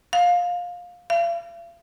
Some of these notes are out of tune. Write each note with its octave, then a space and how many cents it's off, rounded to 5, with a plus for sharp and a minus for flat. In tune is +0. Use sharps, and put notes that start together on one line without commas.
F5 +20
F5 -45